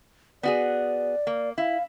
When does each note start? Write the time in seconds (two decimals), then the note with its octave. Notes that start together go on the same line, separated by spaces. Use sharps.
0.43 B3 F#4 G#4 D5
1.27 A#3
1.58 E4 F5